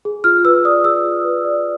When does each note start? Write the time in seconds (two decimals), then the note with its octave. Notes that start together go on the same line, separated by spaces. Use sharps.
0.05 G#4
0.24 F4 F6
0.45 B4 E6
0.65 D5 D#6
0.84 G#4 E6
1.04 F4
1.24 B4
1.45 D5